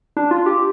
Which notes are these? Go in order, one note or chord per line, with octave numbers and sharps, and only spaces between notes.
D4
F4
G4